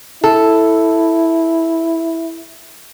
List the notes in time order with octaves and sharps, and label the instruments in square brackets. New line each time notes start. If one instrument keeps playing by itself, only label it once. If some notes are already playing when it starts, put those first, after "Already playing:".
[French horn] E4 [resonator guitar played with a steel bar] A4